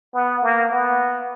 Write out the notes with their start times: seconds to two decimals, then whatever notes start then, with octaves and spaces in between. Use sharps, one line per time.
0.14 B3
0.43 A#3
0.71 B3